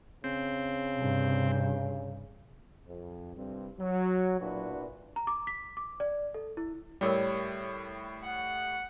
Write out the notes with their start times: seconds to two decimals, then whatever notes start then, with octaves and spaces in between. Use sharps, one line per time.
0.24 C#3 C4
0.96 G2 C3
2.86 F2
3.36 C2 G2 G3 C4
3.79 F#3
4.40 B1 A#2 D4 E4 F#4 B4
5.16 A#5
5.27 D6
5.47 B6
5.77 D6
6.00 D5
6.34 A4
6.57 E4
7.01 A2 G3 A#4 C#5 D5
8.24 F#5